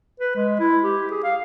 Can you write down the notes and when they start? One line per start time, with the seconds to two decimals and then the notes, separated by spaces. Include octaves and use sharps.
0.20 B4
0.36 G#3
0.60 E4
0.83 G4
1.11 G#4
1.24 F5